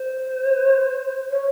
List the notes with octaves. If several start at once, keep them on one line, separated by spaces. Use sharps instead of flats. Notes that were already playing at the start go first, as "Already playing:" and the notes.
Already playing: C5
C#5